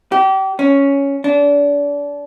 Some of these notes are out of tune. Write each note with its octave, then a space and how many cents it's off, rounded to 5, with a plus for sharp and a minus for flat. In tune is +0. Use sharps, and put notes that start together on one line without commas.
G4 -30
C#4 +5
D4 -30